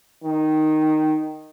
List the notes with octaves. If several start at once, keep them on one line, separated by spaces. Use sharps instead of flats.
D#3